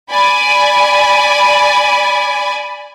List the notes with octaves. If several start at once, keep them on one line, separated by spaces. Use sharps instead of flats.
D5 G#5 B5